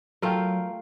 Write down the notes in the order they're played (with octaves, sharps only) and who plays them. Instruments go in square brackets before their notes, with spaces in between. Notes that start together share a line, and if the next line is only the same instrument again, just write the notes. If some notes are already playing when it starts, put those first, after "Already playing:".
[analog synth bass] F#3 [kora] A3 F4 [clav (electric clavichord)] A#4 G5